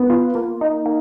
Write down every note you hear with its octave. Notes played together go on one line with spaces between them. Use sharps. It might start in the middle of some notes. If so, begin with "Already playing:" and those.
Already playing: B3 B4
F4
A#3
D#4
A#3